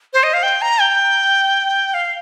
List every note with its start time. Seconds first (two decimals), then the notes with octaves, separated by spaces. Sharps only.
0.13 C5
0.23 D#5
0.33 F5
0.43 G5
0.62 A#5
0.81 G5
1.94 F5